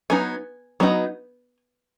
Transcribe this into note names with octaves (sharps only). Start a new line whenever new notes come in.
F#3 B3 D#4 G#5
F#3 B3 D#4